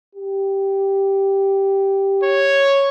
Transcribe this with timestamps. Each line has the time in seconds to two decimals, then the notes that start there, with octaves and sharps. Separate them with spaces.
0.15 G4
2.23 C#5